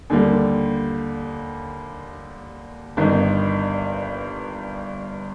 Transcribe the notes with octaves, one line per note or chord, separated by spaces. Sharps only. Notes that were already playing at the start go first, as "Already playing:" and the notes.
D#2 D3 G3 A#3
G1 G2 D#3